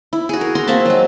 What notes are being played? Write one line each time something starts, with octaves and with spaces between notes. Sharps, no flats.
E4
F#4 G#4
A#4
F#4 A#5 C6
A#3 C4 E5 A5
F#3 G#3